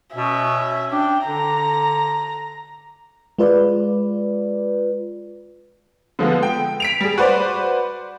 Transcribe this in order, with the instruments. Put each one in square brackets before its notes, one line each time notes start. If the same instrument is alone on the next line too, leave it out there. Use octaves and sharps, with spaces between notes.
[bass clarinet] B2 [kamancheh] C#4 E5
[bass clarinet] D4 [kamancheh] G5
[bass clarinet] D3 [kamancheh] A#5
[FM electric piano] G#3 F4 B4 D5
[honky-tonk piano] D3 F3 G#3 B3
G5
B6 D7 F7
G3 G#4
F#4 B4 C5 D5